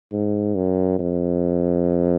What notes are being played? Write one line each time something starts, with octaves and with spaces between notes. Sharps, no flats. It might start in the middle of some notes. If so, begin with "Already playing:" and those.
G#2
F#2
F2